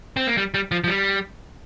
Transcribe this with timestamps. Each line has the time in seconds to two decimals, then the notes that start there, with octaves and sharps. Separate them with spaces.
0.17 C4
0.27 A#3
0.37 G3
0.54 G3
0.71 F3
0.84 F3
0.88 G3